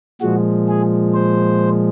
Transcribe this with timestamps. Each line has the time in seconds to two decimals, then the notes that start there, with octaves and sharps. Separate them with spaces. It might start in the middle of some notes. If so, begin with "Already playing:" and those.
0.21 A#2 F3 G#3 F#4
0.68 G#4
1.14 C5